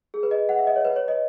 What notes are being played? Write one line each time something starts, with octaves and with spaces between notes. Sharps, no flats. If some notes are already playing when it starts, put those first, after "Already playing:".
G#4
B4
D#5
F#5
E5
D#5
C#5
B4
C#5
D#5